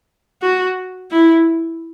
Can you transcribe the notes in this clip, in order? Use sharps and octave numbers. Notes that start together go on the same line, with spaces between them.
F#4
E4